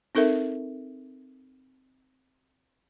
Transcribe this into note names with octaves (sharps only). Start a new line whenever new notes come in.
C4 D#4 A4 A#4 E5